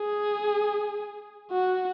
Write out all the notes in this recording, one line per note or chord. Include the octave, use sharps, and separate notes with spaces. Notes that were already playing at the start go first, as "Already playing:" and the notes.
Already playing: G#4
F#4